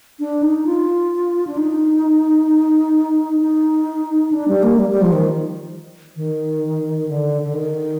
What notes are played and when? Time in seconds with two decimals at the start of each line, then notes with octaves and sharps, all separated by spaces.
0.19 D4
0.42 D#4
0.66 F4
1.47 D4
1.57 D#4
3.40 D#4
4.32 D4
4.48 G3
4.63 A#3
4.79 G3
4.90 G3
5.02 F3
5.13 D#3
6.16 D#3
7.08 D3
7.42 D3
7.53 D#3